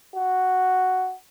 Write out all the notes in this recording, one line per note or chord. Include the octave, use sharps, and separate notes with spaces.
F#4